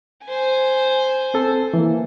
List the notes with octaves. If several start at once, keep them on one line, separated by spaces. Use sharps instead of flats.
C5 G#5
C4 A4
E3 A#3